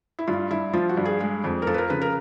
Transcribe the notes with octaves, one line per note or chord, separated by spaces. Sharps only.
E4
G2 F4
G2 E4
F3 F4
F#4
G2
G#4
G#3
F2
A#4
F3 A4
B4
A#4
C#3 B4
A#4